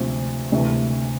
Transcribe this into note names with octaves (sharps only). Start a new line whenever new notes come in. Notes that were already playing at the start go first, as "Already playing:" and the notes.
Already playing: D2 C3 F3 C4
D2 C3 E3 A3